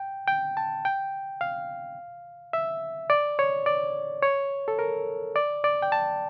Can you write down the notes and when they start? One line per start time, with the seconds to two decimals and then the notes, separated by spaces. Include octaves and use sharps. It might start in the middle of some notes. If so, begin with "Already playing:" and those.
Already playing: G5
0.28 G5
0.57 A5
0.85 G5
1.41 F5
2.53 E5
3.10 D5
3.39 C#5
3.66 D5
4.22 C#5
4.68 A4
4.79 A#4
5.36 D5
5.64 D5
5.82 G5
5.92 A5